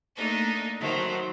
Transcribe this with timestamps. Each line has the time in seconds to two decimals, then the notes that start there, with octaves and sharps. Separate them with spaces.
0.16 A3 A#3 D4 D#4 D#5
0.79 D#3 F#3 A3 C5